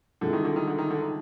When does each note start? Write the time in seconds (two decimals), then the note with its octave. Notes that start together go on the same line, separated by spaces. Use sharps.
0.21 C2 A#2 D3 G#3
0.33 D#3
0.45 D3
0.56 D#3
0.67 D3
0.78 D#3
0.91 D3
1.02 D#3